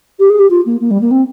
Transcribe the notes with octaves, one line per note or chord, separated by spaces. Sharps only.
G4
G#4
G4
F4
A#3
A#3
G3
A#3
C4